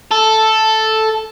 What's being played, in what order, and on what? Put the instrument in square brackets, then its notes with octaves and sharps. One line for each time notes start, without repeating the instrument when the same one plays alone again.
[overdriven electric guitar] A4